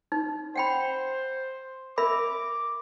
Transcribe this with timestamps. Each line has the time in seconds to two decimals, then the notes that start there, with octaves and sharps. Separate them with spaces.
0.12 D#4
0.56 C5 F#5 G5 B5
1.98 A#4 E5 B5 D6